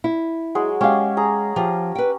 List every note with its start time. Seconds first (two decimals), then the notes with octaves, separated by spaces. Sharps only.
0.04 E4
0.55 F#3 G#3 G#4
0.81 G#3 C#4 G4 F5
1.17 G#4 A#5
1.56 F3 G4
1.95 B4 G5